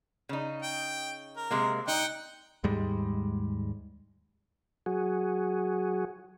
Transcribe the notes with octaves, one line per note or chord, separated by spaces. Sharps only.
C#3 D#4
G5
A#4
C3 G#3 A#3
D#4 F#5 G5
D#2 G#2 G3 G#3
F#3 F#4 G#4